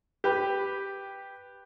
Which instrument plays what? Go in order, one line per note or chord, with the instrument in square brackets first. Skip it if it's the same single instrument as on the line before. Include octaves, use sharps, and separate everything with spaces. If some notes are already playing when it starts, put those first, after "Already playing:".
[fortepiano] G4 B4